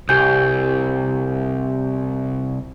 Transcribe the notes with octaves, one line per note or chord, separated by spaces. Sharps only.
C2 G4 G#5 G6